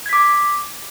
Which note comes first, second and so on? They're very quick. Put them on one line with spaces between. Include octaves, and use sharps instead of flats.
G#6 B6 D6